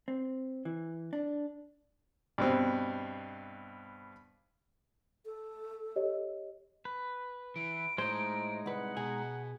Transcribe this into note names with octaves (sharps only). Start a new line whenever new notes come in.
C4
E3
D4
G2 B2 C4
A4
G4 C#5 D#5
B4
E3 D7
A2 G#3 D#4 C5
C2 B4 F#5
B2 G#4